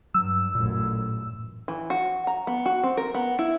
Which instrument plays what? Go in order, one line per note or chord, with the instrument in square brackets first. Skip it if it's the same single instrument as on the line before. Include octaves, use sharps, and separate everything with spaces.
[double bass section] G2 [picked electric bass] F#3 [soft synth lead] E6
[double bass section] A1 F#2 [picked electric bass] A#2
[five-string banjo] E3
F#4
A#5
B3
F#4
C4
A#4
B3
E4